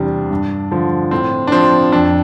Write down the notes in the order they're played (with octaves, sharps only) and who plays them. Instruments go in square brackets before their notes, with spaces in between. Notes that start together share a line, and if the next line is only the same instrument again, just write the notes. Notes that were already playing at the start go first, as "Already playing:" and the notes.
Already playing: [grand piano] E2 C3 G3 D4
G2
D3 F3
A2 C4
D4
F3 C4
F2 D4